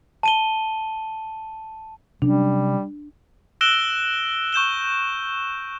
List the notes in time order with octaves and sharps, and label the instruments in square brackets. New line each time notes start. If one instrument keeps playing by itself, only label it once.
[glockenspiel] A5 D#7 G7
[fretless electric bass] C3 F#3 C#4 [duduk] G3 [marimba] D4
[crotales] E6 F#6 A#6 D7 E7 G7
C#6 G6 E7 G7